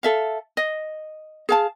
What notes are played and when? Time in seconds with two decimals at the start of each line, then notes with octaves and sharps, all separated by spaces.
0.03 A4 E5 F5
0.57 D#5
1.49 G#4 F5 A5